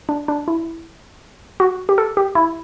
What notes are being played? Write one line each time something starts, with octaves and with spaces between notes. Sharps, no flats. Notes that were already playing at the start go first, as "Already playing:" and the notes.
D4
D4
E4
F#4
G4
A4
G4
E4